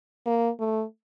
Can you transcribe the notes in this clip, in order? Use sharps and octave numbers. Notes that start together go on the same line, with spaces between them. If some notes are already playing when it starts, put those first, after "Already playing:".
A#3
A3